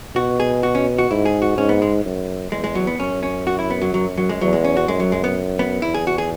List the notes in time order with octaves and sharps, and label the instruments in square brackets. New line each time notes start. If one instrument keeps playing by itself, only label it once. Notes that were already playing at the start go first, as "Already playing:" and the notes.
[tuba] B2 [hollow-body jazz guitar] F#4
[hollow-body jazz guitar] G#4
F#4
C#4
F#4
[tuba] G#2 [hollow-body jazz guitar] E4
[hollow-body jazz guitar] G#4
F#4
[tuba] G#2 [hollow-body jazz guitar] C#4
[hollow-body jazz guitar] B3
G#3
[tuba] F#2
[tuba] E2 [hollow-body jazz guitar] G#3
[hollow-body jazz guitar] G#3
F#3
B3
[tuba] F#2 [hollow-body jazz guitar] C#4
[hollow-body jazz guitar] C#4
F#4
E4
B3
F#3
F#3
F#3
G#3
[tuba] E2 [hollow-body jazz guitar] F#3
[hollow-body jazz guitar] G#3
C#4
F#4
[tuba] F#2 [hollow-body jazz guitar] G#3
[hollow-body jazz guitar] F#3
G#3
B3
B3
[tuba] E2 [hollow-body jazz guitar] E4
[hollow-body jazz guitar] G#4
F#4
G#4